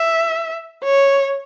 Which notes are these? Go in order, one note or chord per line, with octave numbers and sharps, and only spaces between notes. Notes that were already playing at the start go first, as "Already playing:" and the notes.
Already playing: E5
C#5